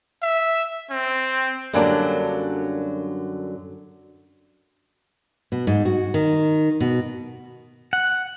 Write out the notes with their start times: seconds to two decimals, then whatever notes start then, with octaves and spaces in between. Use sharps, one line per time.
0.22 E5
0.90 C4
1.73 F#2 D3 F#3 G3 A#3 D4
5.52 B2
5.67 G#2
5.85 F#4
6.14 D#3
6.80 B2
7.93 F#5